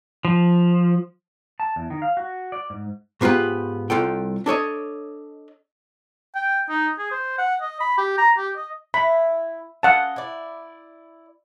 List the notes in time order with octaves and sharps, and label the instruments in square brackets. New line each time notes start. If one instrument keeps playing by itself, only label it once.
[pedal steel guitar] F3
[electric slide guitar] A5
E2
D#3
F5
F#4
D5
G#2
[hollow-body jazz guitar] G#2 B3 F4 G4 B4
C2 F4 A4 G5
D4 A4 C#5 D#5
[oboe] G5
D#4
G#4
C5
F#5
D#5
B5
G4
A#5
G4
D#5
[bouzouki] E4 [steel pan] B5
[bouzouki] C#4 D#5 [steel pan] F5 F#5 A5
[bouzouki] E4 D5